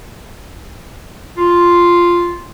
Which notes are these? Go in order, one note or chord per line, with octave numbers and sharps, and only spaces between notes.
F4